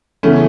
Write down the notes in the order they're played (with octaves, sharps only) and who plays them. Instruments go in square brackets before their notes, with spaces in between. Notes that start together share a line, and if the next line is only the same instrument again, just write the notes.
[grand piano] C#3 E3 B3 [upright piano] A3 C#4